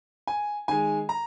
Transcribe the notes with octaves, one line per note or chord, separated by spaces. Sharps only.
G#5
D#3 G#3 G#5
A#5